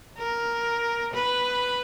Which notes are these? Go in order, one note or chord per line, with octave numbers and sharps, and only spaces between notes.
A#4
B4